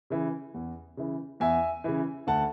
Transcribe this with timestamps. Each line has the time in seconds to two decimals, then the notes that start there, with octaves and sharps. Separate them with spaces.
0.10 C#3 E3
0.54 E2
0.97 C#3 E3
1.40 E2 E5 G#5
1.84 C#3 E3
2.27 D2 F#5 A5